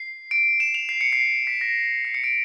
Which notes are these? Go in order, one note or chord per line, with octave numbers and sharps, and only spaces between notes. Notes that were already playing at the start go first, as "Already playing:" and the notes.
Already playing: C7
D7
E7
F7
C7
C#7
C7
B6
A#6
C7
C#7
D7